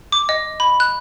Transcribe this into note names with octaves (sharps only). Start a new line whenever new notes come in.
D6
D#5
B5
F#6